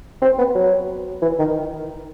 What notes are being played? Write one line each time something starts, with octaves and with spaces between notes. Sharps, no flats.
C4
B3
F#3
E3
D#3